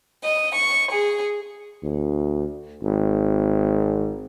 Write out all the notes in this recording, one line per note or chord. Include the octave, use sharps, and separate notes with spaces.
D#5
C#6
G#4
D2
G#1